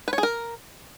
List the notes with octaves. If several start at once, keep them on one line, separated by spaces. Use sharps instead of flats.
B4
C#5
G#4
A#4